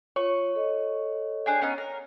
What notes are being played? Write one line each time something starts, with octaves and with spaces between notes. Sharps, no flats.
F4 C#5 C#6
A4 D#5
D4 G#4 G5
B3 C#4 D#4
A#4